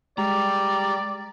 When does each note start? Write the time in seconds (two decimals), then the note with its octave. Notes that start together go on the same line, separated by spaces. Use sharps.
0.18 G3 G#3 D5 A#5